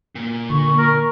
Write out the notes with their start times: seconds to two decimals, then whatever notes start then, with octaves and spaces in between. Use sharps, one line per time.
0.15 A#2
0.50 D3 C#6
0.78 A#4